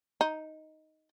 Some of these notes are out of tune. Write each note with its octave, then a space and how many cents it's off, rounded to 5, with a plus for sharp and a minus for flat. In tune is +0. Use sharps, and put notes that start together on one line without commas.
D#4 +5